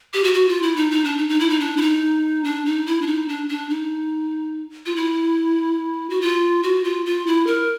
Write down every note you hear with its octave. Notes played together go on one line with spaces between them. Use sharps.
G4
F#4
F#4
F4
E4
D#4
D#4
D4
D#4
D#4
E4
D#4
D4
E4
D#4
D4
D#4
E4
D4
D#4
D4
D4
D#4
F4
E4
F#4
F4
F#4
F4
F4
E4
A#4